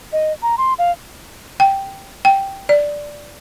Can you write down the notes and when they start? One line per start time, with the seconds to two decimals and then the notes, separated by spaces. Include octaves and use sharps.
0.13 D#5
0.42 A#5
0.58 C6
0.78 F5
1.60 G5
2.25 G5
2.69 D5